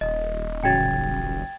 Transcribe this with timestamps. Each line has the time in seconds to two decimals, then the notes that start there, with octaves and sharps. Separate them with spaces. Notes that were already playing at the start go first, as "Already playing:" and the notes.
0.01 D#1 D#5
0.64 A1 C#3 F#3 G5 G#6 A6